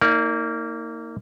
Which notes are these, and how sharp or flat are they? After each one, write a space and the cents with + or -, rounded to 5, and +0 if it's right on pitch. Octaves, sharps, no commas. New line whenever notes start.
A#3 -20 D#4 +35 D5 -20